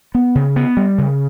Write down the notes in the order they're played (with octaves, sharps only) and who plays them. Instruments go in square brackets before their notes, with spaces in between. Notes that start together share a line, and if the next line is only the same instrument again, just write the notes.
[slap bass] B3
C#3
B3
G3
C#3